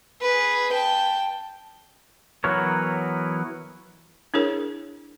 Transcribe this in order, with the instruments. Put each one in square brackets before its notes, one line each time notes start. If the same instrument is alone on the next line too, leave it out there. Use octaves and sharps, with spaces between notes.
[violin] G#4 B4
G5 A5
[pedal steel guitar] E3 F#3 B3 A#4 C#5
[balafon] D4 E4 G#4 A#4 C#5